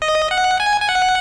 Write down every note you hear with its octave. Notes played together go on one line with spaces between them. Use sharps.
D#5
F#5
G#5
G#5
F#5